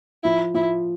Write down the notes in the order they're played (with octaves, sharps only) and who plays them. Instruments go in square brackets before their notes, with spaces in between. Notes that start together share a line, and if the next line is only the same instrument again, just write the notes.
[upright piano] F3 [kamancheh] E4
[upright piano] F3 [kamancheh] E4